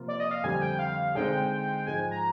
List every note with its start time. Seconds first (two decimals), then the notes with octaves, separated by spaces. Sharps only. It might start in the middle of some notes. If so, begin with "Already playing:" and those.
Already playing: C3 F3 A#3 F4
0.08 D5
0.20 D#5
0.31 F5
0.43 F2 D3 G3 C4 G4 G#5
0.62 G5
0.79 F5
1.15 D3 G#3 C4 D#4 G#4 G5
1.87 G#2 F3 G#3 G#5
2.11 A#5